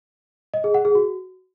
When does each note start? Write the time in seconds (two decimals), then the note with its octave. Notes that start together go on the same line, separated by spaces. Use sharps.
0.54 D#5
0.64 G#4
0.74 F#5
0.85 G#4
0.95 F#4